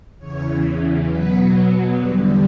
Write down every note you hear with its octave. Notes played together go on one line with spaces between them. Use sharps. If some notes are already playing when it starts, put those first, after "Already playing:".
E2 C#3 E3 C#5
B2 F#3 B3 B4
E2 D3 G3 B4